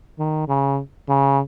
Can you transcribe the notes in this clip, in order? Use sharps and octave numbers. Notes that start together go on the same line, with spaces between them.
D#3
C#3
C#3